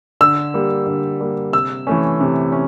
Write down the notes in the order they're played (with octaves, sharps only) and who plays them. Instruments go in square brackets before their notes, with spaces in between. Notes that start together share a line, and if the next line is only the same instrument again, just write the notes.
[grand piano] D3 E6
G3 A#3
D3
G3 A#3
C3 E6
E3 A3 C#4
C3
C#4